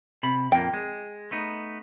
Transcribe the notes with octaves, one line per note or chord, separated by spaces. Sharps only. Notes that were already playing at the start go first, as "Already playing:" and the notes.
C3 B5
F2 A#2 A#3 G5
G#3
A3 B3 D#4